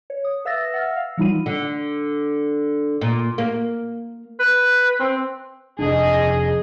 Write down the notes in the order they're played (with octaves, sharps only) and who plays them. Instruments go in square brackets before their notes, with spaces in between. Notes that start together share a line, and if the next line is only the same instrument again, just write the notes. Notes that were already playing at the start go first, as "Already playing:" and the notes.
[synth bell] C#5
D#6
B4 E5 F5 E6 A6 A#6
F#5 E6 F6
F5
E3 G3 D#4 F4 B5 D#7
[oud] D3
A#2
A#3
[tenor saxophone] B4
C4
[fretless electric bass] F1 F2 D4 [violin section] G#4 D#5